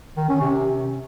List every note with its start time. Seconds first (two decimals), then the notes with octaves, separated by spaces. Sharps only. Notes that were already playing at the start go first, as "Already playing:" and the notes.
0.17 D#3
0.29 C#4
0.41 C3